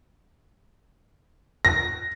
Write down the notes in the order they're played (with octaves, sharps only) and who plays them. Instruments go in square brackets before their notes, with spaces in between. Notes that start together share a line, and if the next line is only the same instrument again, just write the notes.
[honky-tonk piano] A#6